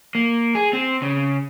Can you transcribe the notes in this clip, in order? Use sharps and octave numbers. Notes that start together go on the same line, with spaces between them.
A#3
G#4
C4
C#3